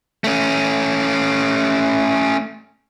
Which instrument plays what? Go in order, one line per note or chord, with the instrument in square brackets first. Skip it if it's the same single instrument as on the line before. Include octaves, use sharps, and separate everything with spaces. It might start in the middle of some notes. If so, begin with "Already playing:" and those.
[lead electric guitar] A3 C#4